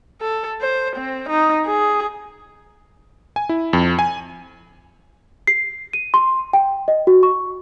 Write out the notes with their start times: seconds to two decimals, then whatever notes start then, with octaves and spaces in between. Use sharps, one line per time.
0.21 A4
0.61 C5
0.96 C4
1.29 D#4
1.66 G#4
3.36 G#5
3.49 E4
3.73 F2
3.99 G#5
5.47 C7
5.93 D#7
6.14 C6
6.53 G5
6.88 D#5
7.07 F#4
7.23 C#6